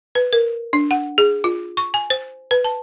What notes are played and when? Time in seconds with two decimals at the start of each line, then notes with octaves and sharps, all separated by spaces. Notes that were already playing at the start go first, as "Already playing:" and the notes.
0.15 B4
0.33 A#4
0.73 D4
0.91 F#5
1.18 G#4
1.44 F4
1.77 C#6
1.94 G#5
2.10 C5
2.51 B4
2.64 A5